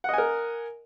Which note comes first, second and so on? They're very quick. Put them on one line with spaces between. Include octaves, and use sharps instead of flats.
F#5 D#5 G#5 A#4